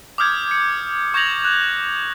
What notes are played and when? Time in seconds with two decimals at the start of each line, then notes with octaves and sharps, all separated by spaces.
0.18 D6 D#6 F6 G6 G#6
0.51 C#7
1.14 C#6 G6 G#6 A#6 F7 F#7
1.45 F#6